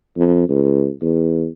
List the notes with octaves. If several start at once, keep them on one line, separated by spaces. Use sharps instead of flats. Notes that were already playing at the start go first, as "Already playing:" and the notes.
F2
C#2
E2